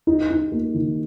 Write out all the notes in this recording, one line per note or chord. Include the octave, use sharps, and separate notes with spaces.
D#4
D#4
A#3
D#3